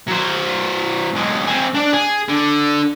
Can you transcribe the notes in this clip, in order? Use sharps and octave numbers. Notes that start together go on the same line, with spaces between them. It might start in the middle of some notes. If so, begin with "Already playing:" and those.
F#3 C5
B1 G#3
C4 G#4
D4 D5
G#4
D3